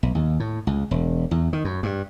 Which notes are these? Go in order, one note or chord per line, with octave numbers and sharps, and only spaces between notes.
B1
D#2
A2
C#2
E1
E2
D#3
F#2
G2